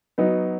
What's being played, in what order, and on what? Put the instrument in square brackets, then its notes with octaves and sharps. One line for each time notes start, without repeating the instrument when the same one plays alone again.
[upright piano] F#3 B3 D#4 F#4